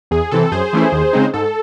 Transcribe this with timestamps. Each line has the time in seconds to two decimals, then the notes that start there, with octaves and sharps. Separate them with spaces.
0.11 E2 G#4
0.31 C3 E3 C4 A4
0.52 F#2 G#4 C5
0.73 E3 A3 C#4 E4
0.92 D#2
1.13 C#3 G#3 C4 D#4
1.34 G#2 A4